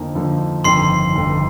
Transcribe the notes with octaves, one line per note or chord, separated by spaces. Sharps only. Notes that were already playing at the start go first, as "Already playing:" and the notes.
Already playing: F2 D3 F3 A#3 D#4
F2 D3 F3 A#3 D#4
G1 F2 D#3 C6 C7
G1 F2 D#3